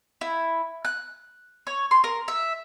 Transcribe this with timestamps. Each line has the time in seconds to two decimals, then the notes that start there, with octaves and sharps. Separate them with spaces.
0.21 E4
0.85 F#6
1.67 C#5
1.91 C6
2.04 A#4
2.28 E5